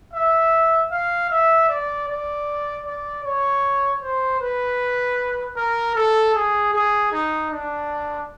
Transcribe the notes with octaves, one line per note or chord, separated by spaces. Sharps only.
E5
F5
E5
D5
D5
D5
C#5
C5
B4
A#4
A4
G#4
G#4
D#4
D4